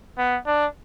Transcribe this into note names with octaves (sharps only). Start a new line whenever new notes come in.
B3
D4